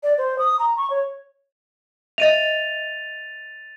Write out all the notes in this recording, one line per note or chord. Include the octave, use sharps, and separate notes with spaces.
D5
C5
D#6
A#5
C#6
C#5
D#5 E5 A6 D#7 F7